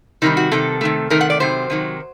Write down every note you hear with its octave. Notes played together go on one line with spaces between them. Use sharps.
C3 D#3 G3 D#4
F#4
C3 D#3 G3 A4
C3 D#3 A3
C3 D#3 A3 A#4
F#5
D5
C3 D#3 F#3 C5
C3 D#3 F#3